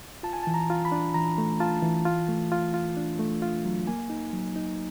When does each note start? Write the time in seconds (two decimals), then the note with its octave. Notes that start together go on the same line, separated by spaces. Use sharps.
0.23 F4 A5
0.33 G#5
0.43 E3 A5
0.54 A#5
0.70 F4
0.85 B5
0.92 D4
1.14 E3 A#5
1.38 A3
1.60 F4 A5
1.82 E3
2.05 F4
2.29 A3
2.52 F4
2.74 F4
2.97 D4
3.19 A3
3.42 F4
3.65 F#3
3.87 A#3 G#5
4.10 D#4
4.33 F#3
4.56 D#4